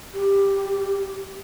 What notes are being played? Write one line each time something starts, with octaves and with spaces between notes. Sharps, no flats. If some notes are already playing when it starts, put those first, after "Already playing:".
G4